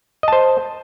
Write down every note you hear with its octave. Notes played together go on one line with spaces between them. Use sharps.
C5 D#5 A5